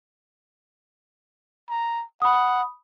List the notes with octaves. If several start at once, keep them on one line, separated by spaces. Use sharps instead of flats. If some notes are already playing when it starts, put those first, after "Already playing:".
A#5
F#5 B5 D#6